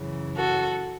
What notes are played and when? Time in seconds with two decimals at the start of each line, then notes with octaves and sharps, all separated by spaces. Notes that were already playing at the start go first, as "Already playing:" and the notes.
Already playing: F#2 C#3 E3
0.35 F#4 A4